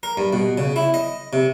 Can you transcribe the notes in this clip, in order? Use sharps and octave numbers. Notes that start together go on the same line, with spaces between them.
A#4
G2
B2
C#3
E4
D#5
C3